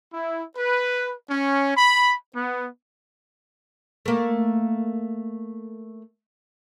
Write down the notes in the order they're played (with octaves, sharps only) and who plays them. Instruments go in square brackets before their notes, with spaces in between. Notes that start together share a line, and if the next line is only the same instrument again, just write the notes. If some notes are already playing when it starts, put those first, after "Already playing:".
[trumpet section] E4
B4
C#4
B5
B3
[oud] A3 A#3